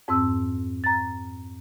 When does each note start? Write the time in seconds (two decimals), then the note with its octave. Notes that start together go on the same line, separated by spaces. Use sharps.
0.08 F2 G#2 C4 E6
0.84 A#5 A6